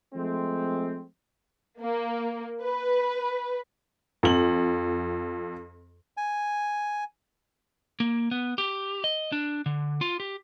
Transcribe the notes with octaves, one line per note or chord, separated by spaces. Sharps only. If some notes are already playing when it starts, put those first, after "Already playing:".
F3 G#3 A3 C4
A#3
B4
F2 F#7
G#5
A#3
B3
G4
D#5
D4
D3
F4
G4